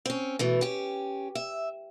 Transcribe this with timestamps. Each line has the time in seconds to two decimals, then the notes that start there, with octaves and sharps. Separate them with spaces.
0.06 C4 C#4
0.39 B2 E3 A3
0.61 C#4 G4
1.35 E5